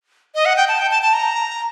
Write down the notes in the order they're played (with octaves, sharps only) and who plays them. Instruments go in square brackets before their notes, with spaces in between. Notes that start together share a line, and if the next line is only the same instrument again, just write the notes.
[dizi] D#5
F#5
G5
A5
G5
A5
A5
A#5